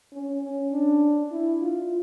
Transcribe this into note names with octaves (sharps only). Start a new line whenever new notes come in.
C#4
C#4
D4
E4
F4